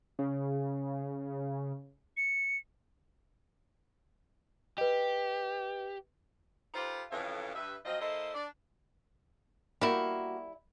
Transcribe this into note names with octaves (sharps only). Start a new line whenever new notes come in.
C#3
C#7
G4 B4 D#5
D#4 F4 G4 A4 B4 C5
F2 C#3 E3 A4 C#5 F5
G2 B4 E5
F3 F#3 C4 F4 D#5
A#3 E4 A4 C5 D#5
D4 D5
G3 A#3 E4 F#4